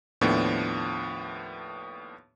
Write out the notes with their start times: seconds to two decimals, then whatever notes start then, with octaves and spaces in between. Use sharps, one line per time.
0.21 D#2 A2 F3 B3 D4